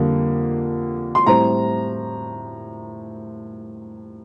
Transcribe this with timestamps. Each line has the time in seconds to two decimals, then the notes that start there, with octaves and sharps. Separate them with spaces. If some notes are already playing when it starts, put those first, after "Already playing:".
Already playing: F2 D3 G3 A#3
1.15 C6
1.26 A2 G3 C4 A#5